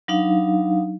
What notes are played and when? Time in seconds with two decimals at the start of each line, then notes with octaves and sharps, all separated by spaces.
0.08 F#3 D4 D#4 F5